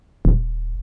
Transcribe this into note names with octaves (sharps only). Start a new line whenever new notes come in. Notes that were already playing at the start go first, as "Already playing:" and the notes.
D#1